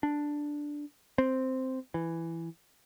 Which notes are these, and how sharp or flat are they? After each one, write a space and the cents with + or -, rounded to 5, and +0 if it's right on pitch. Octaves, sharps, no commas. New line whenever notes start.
D4 +0
C4 -5
E3 +10